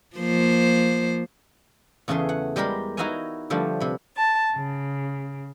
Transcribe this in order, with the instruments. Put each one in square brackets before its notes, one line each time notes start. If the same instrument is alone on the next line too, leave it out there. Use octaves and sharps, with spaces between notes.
[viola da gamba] F3 A#3 C5
[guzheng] E2 C#3 A3 G#4 C6
F#5
G3 G#3 G4 A#4 B5
D#4 E4 F#4 D#5 F5 G#5
D3 F3 G3 A3
C3 B5
[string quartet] A5
C#3